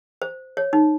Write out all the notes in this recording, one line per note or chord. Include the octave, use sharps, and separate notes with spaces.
C5
C#5
D#4